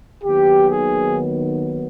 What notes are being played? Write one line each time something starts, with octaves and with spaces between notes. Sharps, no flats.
D#2 D#3 F#3 B3 G4
G#4